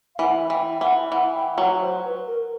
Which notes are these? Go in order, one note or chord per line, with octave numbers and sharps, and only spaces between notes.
F5
E3 F#5
E3 G5
E3 F#5
E3 F#5
G5
F#3 F#5
C5
B4
A#4